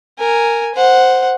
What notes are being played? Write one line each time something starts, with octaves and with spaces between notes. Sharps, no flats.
A#4 G#5
C5 F#5